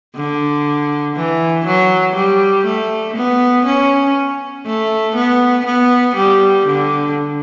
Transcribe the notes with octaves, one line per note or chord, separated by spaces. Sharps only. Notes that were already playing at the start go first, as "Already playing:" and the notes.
D3
E3
F#3
G3
A3
B3
C#4
A3
B3
B3
G3
D3